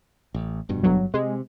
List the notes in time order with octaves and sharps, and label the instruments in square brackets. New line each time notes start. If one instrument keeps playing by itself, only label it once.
[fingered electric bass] A1
F1 G2 B2
[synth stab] G1 F#3
[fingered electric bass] C3 [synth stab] G#3